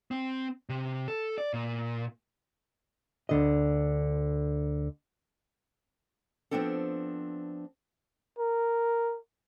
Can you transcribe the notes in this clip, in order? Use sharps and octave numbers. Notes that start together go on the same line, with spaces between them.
C4
C3
A4
D5
A#2
D2 D3 D#5
F3 A3 B3 C4 D4 A4
A#4